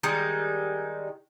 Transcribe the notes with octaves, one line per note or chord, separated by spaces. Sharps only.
D#3 G3 G#3 D#4